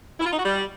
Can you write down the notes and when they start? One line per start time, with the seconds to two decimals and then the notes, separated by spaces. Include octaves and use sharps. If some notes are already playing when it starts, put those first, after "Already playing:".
0.20 E4
0.26 F4
0.32 D#4
0.38 F#4
0.45 G3